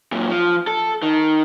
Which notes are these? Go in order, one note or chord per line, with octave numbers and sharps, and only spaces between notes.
F#2 A#2
F3
A4
D#3